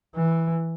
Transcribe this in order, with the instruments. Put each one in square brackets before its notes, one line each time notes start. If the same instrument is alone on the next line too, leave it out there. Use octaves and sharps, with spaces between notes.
[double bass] E3